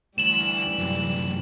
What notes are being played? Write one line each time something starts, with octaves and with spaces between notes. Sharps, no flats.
D2 E3 G3 E7 F#7
F#2 C3